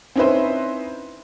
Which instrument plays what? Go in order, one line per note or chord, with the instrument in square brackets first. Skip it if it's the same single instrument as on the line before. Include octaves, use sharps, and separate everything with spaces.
[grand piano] C4 C#4 D#4 E4 B4 C5